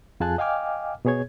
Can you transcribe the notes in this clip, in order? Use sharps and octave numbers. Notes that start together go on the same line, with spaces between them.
F2 F4 G#4 G#5 A5 F#6
D#5 F5 G5 G#5 D6 F6
B2 B3 G#4 C#5 G#6